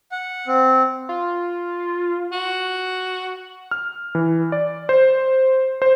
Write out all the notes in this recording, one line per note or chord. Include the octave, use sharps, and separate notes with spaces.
F#5
C4
F4
F#4
F6
E3
D5
C5
C5